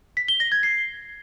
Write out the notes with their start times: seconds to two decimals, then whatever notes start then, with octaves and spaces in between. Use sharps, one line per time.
0.17 B6
0.28 G7
0.40 A#6
0.52 G#6
0.63 C7